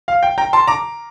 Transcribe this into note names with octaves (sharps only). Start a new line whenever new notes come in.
F5
G5
G5 A#5
A5 C6
A#5 D6